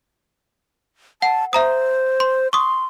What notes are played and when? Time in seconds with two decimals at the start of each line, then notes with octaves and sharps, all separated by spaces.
1.22 F#5 A5
1.53 C5 E5 A#5 D#6
2.20 C6
2.53 C6 C#6 D#6